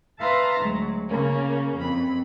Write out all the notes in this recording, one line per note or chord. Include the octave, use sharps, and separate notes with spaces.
B4 E5 F5 A5 A#5 C6
D2 F#3 G#3
C#3 A#3 C#4
F2 B5